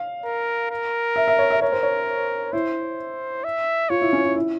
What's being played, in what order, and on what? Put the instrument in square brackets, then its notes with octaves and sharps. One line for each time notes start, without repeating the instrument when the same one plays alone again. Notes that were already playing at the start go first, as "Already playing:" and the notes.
Already playing: [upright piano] F5
[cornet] A#4
A#4
[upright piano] E5
E5
C#5
E5
[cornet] A#4 [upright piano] C#5
[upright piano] C5
C#5
[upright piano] E4 [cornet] C5
[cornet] E5
[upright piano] F4 [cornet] C#5
[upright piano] E4
C#4
E4
E4